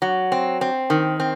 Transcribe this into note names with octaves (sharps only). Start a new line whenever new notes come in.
F#3
C4
C4
D#3
C4